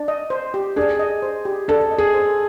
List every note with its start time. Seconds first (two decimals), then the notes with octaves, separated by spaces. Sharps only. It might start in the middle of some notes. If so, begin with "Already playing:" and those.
Already playing: D4
0.08 D#5
0.30 C5
0.54 G4
0.76 D4 G#4
0.99 D#5
1.22 C5
1.45 G4
1.68 D4 A4
1.91 D#5
1.98 G#4
2.14 C5